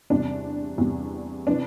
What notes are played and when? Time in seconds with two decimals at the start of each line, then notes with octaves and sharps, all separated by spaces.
0.10 E2 C3 G3 D4
0.78 E2 C3 G3
1.47 C3 E3 D4